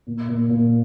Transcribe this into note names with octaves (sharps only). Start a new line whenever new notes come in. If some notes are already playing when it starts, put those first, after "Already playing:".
A#2
A#2
A#2